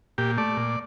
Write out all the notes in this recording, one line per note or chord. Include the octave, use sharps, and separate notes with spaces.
A#2 G4
A3 D5
A#2